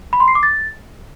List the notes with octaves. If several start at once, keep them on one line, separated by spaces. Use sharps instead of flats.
B5
C6
C7
D6
A6